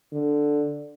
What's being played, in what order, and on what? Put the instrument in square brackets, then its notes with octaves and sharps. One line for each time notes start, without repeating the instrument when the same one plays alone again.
[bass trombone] D3